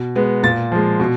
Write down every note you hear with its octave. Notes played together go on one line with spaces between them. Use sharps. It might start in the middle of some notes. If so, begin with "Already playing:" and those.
Already playing: B2
G#3 B3
A#2 A6
F3 G#3
B2